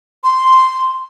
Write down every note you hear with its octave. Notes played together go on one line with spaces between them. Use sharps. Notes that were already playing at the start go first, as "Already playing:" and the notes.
C6